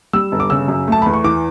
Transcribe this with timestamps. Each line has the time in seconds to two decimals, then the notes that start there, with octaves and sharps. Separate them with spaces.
0.13 G3 E6
0.32 G1
0.40 D6
0.50 C#3 E6
0.68 F#2
0.87 A3 A5
1.02 E2 B5
1.14 C#6
1.24 E3 D6